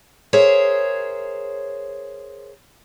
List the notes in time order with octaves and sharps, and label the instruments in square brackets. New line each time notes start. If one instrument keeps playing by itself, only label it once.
[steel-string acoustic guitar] G#4 A#4 C5 C#5 E5